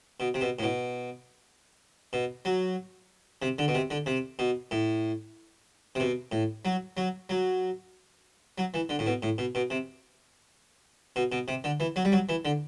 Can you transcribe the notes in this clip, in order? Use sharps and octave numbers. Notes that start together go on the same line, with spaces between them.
B2
C3
B2
A2
B2
B2
F#3
C3
D3
B2
C3
D3
C3
B2
A2
C3
B2
A2
F#3
F#3
F#3
F#3
E3
D3
A2
B2
A2
B2
B2
C3
B2
B2
C3
D3
E3
F#3
G3
F#3
E3
D3